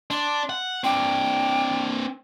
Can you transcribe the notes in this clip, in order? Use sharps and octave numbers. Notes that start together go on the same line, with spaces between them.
D4 C6
F#5
C4 D4 G5